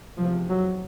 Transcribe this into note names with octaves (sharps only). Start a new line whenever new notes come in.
F1 E2 C3 F3
F#3